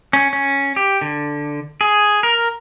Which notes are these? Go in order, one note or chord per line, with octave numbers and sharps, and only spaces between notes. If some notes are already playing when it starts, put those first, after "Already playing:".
C#4
C#4
G4
D3
G#4
A#4